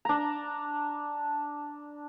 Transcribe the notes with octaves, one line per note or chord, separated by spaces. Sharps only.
D4 A#5